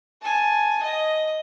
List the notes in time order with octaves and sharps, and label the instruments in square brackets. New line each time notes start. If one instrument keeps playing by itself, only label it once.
[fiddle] G#5 A5
D#5